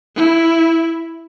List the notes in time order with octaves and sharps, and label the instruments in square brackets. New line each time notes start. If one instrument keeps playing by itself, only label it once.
[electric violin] E4